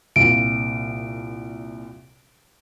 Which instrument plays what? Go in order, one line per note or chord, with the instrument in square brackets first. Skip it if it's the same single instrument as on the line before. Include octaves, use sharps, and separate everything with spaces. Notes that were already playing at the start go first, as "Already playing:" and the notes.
[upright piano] C2 A#2 [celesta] D7